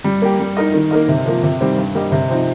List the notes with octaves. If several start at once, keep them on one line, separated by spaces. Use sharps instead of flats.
G3
A#3 G4
G3
D#4 A#4 D#5
D#3
A#3 D#4 A#4 D#5
C3
F3 A#3
C3
D#3 G3 C4 G4
G2
G3 A#3 G4 D#5
C3
F3 C4 D#4